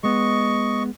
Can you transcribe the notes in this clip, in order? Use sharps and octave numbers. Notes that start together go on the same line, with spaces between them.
G#3 B3 D#5 C#6